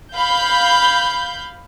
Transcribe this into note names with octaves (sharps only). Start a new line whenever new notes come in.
F5 B5 G6